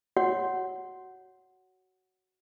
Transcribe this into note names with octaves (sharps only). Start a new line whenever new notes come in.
F#4 C#5 F#5